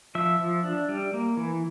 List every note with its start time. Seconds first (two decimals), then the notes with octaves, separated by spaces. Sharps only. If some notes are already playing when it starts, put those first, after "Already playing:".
0.15 F3 E5
0.39 F3
0.64 D4
0.89 G3
1.14 A#3
1.37 E3